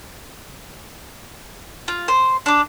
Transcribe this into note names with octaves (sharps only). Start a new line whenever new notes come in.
F4
C5 C6
D4 D6